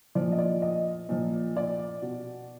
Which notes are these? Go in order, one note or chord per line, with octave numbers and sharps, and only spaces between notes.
A#2 F3 D5
D#5
D5
D#5
A#2 F3
D5
B2